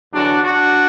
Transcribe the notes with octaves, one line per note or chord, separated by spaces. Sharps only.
E2 D3 F#3 D4 F#4
D4 F#4